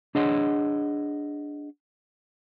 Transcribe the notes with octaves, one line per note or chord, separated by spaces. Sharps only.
D4 G#4 C#5 D#5 F#5 C6